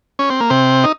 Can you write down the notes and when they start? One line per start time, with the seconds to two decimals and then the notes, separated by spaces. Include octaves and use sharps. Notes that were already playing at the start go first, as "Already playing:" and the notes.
0.19 C#4
0.30 C4
0.40 A#3
0.50 C3 C4
0.84 D#4